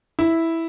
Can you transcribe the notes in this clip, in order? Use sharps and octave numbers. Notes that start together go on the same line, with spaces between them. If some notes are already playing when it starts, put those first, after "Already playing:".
E4